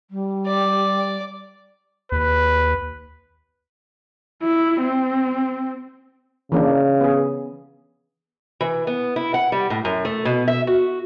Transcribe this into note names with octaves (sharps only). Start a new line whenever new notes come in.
G3
D5
D#2 B4
E4
C4
C#3 E3 A#3 D4
B3 G#4
E3
B3
E4
F#5
G3
A2
F#2
A3
B2
E5
F#4